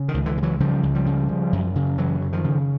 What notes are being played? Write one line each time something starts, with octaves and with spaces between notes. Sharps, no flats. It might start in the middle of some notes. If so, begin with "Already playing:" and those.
Already playing: C#3
D#3
C#2
D3 E3
C#3
E3 F#3
C#3 F3 G3
C#2
F3 G3
C#3
C#3
F#2
C#3
F#2 E3 F#3
C#3
D#3 F3
C#3